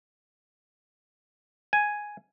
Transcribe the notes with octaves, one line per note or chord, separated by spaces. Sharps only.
G#5